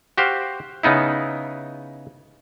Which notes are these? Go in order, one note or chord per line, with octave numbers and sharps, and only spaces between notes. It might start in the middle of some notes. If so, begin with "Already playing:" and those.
F#4 G4 C5 F5
C#3 B3 D#4 E4